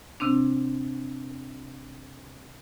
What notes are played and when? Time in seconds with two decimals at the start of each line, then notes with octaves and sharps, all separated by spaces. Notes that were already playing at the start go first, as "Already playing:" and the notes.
0.20 C3 C4 D4